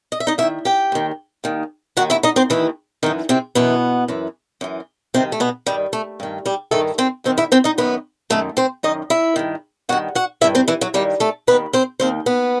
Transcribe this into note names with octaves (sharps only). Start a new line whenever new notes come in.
D#5
E5
D#4 D#5
D#2 E4 E5
D#3
G4 G5
D#2 D#3
D#2 D#3
D#2 D#3 F#4 F#5
E4 E5
D#4 D#5
C4 C5
D#2 D#3 E3 E4
F#2 D#3 E3 D#4
C3 C4
F#2 B2 E3 B3
F#2 E3
F#2 E3
G2 C3 D#3 C4
A3
B2 B3
G2 D#3 G3
A3
G2 D#3
G3 G4
G2 D#3 A3 A4
C4 C5
F#2 D#3 C4 C5
E4 E5
C4 C5
D#4 D#5
F#2 D#3 B3 B4
F#2 D#3 A3 A4
C4 C5
F#2 D#3 D#4 D#5
E4 E5
G2 D#3
G2 D#3 F#4 F#5
F#4 F#5
G2 D#3 E4 E5
C4 C5
E3 E4
F#3 F#4
G2 D#3 G3 G4
A3 A4
D#2 D#3 B3 B4
C4 C5
D#2 D#3 C4 C5
B3 B4